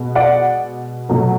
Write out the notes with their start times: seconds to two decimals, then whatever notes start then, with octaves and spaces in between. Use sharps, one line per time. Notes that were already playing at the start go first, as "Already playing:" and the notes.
Already playing: B2 G#3 B3
0.15 D5 F#5
1.09 B2 F#3 A3